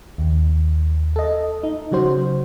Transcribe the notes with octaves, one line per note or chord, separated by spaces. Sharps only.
D#2
A4 D#5
D#4
C#3 F#3 F#4 C5